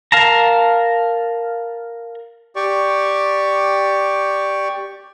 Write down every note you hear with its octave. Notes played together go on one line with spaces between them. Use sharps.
A#4 F5 A5 A#5
G4 D5 C#6